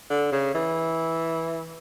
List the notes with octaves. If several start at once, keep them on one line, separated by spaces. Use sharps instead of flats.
D3
C#3
E3